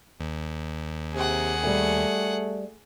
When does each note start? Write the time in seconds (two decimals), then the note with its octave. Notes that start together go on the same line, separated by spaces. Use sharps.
0.20 D#2
1.14 C3 G#4 F#5
1.63 G3 A3 G#5